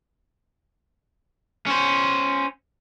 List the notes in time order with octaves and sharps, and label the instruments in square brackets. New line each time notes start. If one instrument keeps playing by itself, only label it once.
[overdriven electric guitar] C#4 C5